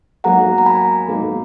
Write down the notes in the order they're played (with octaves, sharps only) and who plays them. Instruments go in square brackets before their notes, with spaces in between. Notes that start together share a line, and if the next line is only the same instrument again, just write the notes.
[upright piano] G#2 F#3 A#3 [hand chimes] F#5 A#5
[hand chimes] A#5
G#5 B5
[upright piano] G#2 F#3 A#3